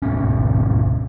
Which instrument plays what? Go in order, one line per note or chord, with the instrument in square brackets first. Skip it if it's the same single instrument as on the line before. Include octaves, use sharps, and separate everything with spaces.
[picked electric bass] D1 G#2 B2 C#4